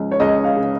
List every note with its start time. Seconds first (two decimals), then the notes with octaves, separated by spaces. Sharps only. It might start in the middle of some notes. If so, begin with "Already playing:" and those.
Already playing: C#2 F3
0.11 C#5
0.20 C#2 D#5
0.44 F5
0.57 C#3